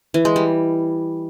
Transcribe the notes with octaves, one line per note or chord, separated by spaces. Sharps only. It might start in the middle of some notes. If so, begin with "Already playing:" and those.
E3
G#3
G3